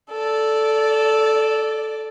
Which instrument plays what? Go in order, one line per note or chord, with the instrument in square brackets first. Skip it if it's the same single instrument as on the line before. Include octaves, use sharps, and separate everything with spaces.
[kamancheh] A4 D5